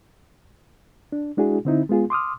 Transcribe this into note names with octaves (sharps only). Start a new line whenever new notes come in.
D4
G#3 D4 E4 F#4 G#4
D3 C4 D#4 E4
G#3 B3 F4 G#4
C6 D6 D#6 F6